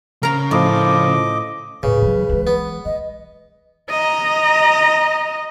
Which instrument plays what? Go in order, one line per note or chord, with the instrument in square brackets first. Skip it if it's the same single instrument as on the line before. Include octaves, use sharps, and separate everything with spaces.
[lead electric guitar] C#3 [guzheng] A#4 A#5
[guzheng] A2 [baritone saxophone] F3 [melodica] D#5 D6
[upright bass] D#2 A2 [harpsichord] C#3 [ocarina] B4
[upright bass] E3 F#3
E3 G#3
[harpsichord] B3
[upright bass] E3 [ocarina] D#5
[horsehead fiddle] D#5 A#5